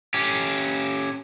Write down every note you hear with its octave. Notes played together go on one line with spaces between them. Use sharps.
C#4 G4